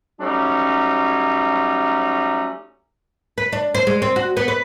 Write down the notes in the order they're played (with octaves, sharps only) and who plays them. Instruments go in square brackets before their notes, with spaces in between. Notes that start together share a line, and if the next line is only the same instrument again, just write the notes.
[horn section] F#3 G3 A3 C#4 D#4
[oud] B4
D4
C5
G#3
C4
F#4
B3
B4